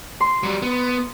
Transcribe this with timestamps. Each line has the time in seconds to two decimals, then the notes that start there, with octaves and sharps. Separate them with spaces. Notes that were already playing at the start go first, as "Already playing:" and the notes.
0.21 C6
0.43 F#3 G3
0.62 B3